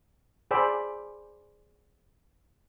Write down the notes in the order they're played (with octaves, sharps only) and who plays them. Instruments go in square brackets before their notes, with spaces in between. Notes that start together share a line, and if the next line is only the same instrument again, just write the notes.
[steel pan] G#4 C5 D5 G5 B5 E6